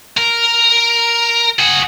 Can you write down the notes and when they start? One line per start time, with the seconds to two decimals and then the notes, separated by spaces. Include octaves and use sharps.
0.18 A#4
1.59 F#4 G#4